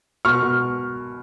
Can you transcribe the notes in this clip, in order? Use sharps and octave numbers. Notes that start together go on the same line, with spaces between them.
B2 C#6 F6
B2